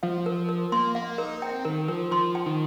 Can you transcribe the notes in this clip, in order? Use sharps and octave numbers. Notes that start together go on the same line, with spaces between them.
F3 F5
A#4
A#4
A#3 C6
A#3 F5
D#4 A#4
C4 G5
D#3 A#4
F3 A#4
F3 C6
G5
D#3